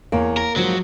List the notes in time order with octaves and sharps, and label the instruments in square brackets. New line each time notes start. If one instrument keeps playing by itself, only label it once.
[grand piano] E2 C#5 [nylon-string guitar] A#3
[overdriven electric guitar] A#4
[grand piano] G#2 F3 [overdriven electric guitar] F#3